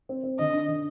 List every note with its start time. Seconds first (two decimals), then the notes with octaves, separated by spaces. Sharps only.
0.09 C4
0.24 C4
0.39 D3 D#5
0.53 D4
0.68 D3